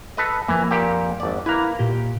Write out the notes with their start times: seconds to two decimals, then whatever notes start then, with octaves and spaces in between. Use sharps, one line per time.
0.17 A4 B4 D#5
0.48 F2 E3 A#3
0.71 A#2 G4
1.20 G#1 D5
1.46 A#3 E4 B4 A#5
1.79 A#2 G4